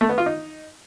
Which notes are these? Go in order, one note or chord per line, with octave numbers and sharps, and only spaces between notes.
A3
B3
F4
D#4